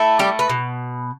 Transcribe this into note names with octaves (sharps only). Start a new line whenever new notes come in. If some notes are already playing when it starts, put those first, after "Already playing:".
Already playing: A3 E4
G3 G4
B4
B2